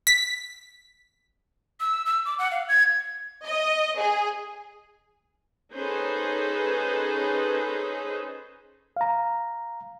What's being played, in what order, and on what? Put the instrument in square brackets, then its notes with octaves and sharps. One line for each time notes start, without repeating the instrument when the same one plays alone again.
[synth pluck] B6
[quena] E6
E6
D6
F#5
F5
G#6
[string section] D#5
G#4
[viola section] C#4 D#4 G#4 A4 B4 C5
[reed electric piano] F5 A#5